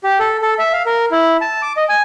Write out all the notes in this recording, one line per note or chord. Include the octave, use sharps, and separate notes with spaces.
G4
A4
A4
E5
F5
A#4
E4
A5
D6
D#5
G#5